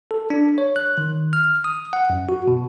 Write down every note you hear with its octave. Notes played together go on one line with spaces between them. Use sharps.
A4
D4
C#5
F#6
D#3
F6
D#6
F#5
F#2
F#4
B2